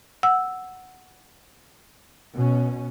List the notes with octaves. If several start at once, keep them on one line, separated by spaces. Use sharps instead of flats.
F#5 E6
B2 C#4